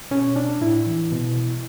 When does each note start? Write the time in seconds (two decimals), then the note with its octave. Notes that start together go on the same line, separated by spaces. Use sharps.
0.11 B2 C#4
0.36 D4
0.61 A2 E4
0.86 E3
1.12 B2